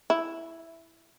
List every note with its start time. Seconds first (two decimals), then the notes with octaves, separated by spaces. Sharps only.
0.10 E4